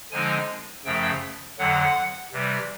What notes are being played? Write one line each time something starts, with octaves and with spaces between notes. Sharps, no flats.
D3 F3 G#3 C4 D#4 G#5
F#2 C#3 F3 A3 G5
F2 D3 F#3 F#5
C3 E3 G3